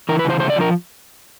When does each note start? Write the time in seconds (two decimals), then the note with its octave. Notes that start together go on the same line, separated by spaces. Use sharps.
0.09 E3 A#4
0.19 B4
0.25 C#3 C5
0.40 A3 C5
0.50 D5
0.56 F3
0.61 A#4